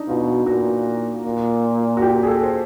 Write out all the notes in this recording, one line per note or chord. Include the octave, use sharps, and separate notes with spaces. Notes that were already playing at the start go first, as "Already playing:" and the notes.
Already playing: D4 D#4
B2 F4
F#4
A#2 F#4
A#2
F#4
G4
G#4
A4
C5